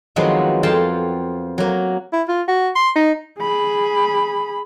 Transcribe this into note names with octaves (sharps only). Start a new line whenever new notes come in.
D#3 F3 F#3 G#3 B3 C4
F2 F4 F5 G5 A5
F#3 A#3
E4
F4
F#4
C6
D#4
G#4 B5